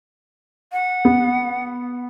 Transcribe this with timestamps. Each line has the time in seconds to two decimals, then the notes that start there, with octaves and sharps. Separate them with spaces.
0.72 F#5
1.05 B3